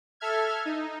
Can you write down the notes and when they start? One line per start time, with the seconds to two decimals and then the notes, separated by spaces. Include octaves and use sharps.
0.20 A4 E5 F6 G#6
0.65 D#4